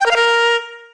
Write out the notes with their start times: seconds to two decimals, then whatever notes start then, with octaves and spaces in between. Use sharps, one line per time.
0.01 G5
0.06 A#4
0.11 F5
0.16 A#4